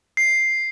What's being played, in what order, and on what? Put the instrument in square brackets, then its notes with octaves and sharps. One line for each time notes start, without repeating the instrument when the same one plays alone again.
[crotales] C7